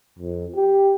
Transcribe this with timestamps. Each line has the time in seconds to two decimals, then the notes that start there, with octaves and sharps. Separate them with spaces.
0.19 F2
0.56 G4